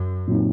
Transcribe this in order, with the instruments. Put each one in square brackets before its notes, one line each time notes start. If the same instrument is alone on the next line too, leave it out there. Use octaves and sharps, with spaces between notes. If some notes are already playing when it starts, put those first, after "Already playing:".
Already playing: [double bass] F#2
[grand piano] A#2 F#3 C4 D#4